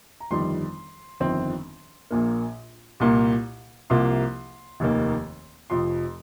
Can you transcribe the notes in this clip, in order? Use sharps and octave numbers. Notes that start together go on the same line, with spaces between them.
A#5
G1 F2 D#3 G3 C6
G1 F2 D#3 C4
A#1 A#2 A#3
C2 A#2 A#3
C2 C3 F3 A#3 C6
F1 D#2 D#3 A#3
F1 F2 F3 C6